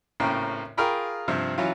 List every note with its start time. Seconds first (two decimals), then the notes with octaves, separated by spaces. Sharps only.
0.20 G#1 A2 C#3 A#3 G5
0.77 F4 G#4 A#4 G5 B5 C#6
1.28 G2 C3 F3
1.58 E3 F#3 C#4 E4 F4